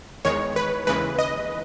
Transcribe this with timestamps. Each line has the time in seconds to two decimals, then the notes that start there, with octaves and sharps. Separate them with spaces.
0.25 E2 D#3 G#3 C#5
0.56 B4
0.87 D#2 C#3 E3 G#3 B4
1.19 D#5